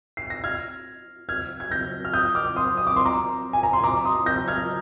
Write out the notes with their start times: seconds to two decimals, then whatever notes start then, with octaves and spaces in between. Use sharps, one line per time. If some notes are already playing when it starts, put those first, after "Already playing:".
0.17 C7
0.30 A#6
0.44 F6 G#6
1.29 F6 G#6
1.60 G#6
1.71 G6 A#6
2.05 F6
2.14 D#6 G6
2.35 D6 F6
2.56 C6 D#6
2.77 D#6
2.87 D6
2.96 C6
3.05 A#5 D6
3.53 G#5
3.63 A#5
3.73 C6
3.84 A#5 D6
4.05 C6 D#6
4.26 G6 A#6
4.48 F6 G#6